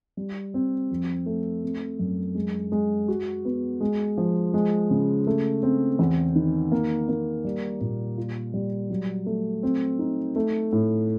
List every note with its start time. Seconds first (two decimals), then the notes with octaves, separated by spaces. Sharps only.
0.17 G3
0.54 C4
0.91 F2
1.26 A3
1.63 C4
1.99 F#2
2.35 G#3
2.72 G#3
3.08 F#4
3.45 B3
3.81 G#3
4.18 F3
4.54 G#3
4.91 C#3
5.27 A3
5.63 C4
5.99 E2
6.36 D#3
6.72 A#3
7.09 A#3
7.45 G3
7.81 A#2
8.18 F4
8.54 G3
8.90 F#3
9.26 A3
9.63 C4
9.99 D#4
10.36 A3
10.72 A2